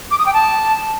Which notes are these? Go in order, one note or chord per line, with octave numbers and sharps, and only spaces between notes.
D6
D#6
G5
A5